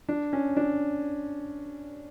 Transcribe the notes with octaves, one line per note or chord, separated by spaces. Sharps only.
D4
C#4
D4